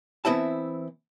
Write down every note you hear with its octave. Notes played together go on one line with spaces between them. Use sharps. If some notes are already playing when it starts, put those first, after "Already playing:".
E3 B3 C4 E4 E5 A5